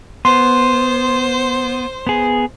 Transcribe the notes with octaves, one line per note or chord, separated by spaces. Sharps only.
B3 C5 C6
B3 G#4